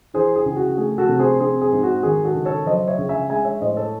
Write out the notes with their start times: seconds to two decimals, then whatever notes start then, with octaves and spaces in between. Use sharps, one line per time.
0.14 E3 G#4 C5
0.36 G#4
0.45 C#2
0.56 F#4
0.77 A3 G#4
0.98 F#4 A4
1.09 C3
1.19 G#4 C5
1.40 C4 G#4
1.61 G#4
1.72 G#2
1.83 F#4
2.03 D#3 G#4
2.24 F#4 A4
2.35 C#2
2.45 A4 C#5
2.66 F#3 C5 D#5
2.88 C#5 E5
2.98 C#2
3.09 E5 G#5
3.29 G#3 E5 G#5
3.45 C#5 E5
3.61 A2 C5 D#5
3.77 A4 C#5